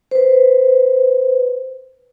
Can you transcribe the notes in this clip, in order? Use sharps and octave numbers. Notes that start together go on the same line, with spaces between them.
B4 C5